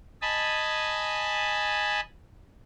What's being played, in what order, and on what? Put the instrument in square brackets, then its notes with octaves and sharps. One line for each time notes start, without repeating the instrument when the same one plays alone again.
[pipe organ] D#5 G#5 A5 B5